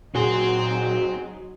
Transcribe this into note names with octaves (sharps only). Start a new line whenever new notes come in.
A#2 F#3 C4 D#4 F#4 G#4 C6